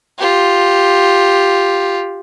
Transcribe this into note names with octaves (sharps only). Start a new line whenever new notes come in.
F4 G4